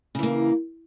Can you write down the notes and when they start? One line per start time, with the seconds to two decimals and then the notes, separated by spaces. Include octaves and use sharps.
0.15 C#3
0.19 E3
0.23 A#3